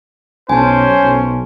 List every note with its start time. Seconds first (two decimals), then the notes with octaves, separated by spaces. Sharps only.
0.49 B1 C#4 C5 G#5 A5
1.03 B1